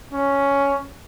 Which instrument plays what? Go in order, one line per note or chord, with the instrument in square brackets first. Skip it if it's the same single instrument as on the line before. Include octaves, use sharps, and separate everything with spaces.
[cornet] C#4